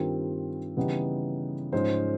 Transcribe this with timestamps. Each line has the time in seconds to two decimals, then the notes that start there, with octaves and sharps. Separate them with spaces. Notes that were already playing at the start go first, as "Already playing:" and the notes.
Already playing: G2 D#3 G3 C4 F4 A#4
0.77 C#3 E3 G3 B3 D#4
1.72 G#2 F3 G#3 C#4 C5